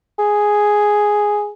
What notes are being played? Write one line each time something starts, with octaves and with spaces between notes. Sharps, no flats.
G#4